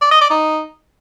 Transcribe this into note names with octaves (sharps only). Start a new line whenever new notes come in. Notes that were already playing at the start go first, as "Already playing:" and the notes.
D5
D#5
D5
D#4